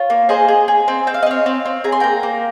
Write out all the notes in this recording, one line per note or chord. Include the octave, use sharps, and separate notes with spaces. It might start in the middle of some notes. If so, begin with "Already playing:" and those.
Already playing: F4 C#5
A#3
G#4 C5 D#5
G#4
G#4
C4
C4 G5
F5
D#5
C4 C#5 F5
C4
C4
G#4 A#5
C6
A#3 G5 A#5
A#3